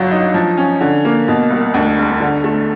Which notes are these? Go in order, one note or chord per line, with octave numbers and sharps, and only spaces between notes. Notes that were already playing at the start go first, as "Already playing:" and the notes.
Already playing: G1 F#3
D#4
F3
C#4
D3
A#3
B2
C2
D2
E1
D3
A3